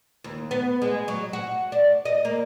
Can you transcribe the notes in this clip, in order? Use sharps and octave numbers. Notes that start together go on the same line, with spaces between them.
D#2
B3
G#3
F#3
F#4
D4
D#5
A#3